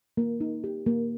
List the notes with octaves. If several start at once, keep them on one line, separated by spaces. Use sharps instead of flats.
A#3
D#4
G4
A#3